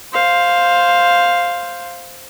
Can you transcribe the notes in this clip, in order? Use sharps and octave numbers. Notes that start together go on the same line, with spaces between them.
C5 F5